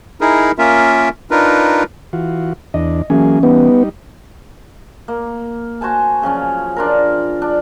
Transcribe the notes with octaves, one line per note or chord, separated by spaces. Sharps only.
D#4 E4 G#4 A#4
A#3 C#4 F4 A#4 E5
D4 D#4 F4 A#4 B4
E3 F4 F#4
E2 D4 D#5
E3 F#3 A#3 C#4 G#4
G3 B3 D#4
A#3
F#4 C5 G#5 A5
C#3 F3 F#3 C#4
D4 F4 A#4
D4